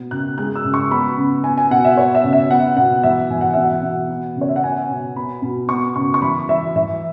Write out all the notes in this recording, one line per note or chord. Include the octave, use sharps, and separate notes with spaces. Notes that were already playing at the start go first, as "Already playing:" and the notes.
Already playing: B2 B3
C#3 F#6
G#3 F#6
E6
C#3
C#6
B3 B5
C#3
B3 G#5
G#5
B2 F#5
E5
B3 C#5
E5
C#3
E5
B3 F#5
B2 F#5
E3 E5
E3 G#5
F#5
B2 E5
F#5
B2
B3
C#3
C#5
E5
F#5
B3 G#5
B2
B3 B5
B2
B3 C#6
C#3 C#6
C#6
E3 B5
E3 E5
E3 E5